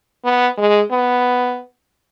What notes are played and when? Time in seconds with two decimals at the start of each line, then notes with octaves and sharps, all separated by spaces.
0.24 B3
0.58 G#3
0.91 B3